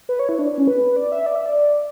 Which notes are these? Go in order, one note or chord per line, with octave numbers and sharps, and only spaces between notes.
B4
C#5
E4
D4
C#4
B4
D5
E5
D5
E5
D5